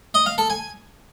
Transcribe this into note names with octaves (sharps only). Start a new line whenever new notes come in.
D#5
F5
A4
G#5